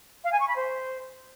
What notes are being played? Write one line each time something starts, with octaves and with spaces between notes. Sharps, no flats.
F5
G#5
C#6
B5
C5